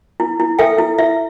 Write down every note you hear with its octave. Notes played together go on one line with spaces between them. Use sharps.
E4
E4
A4 E5 G5
E4
E4 E5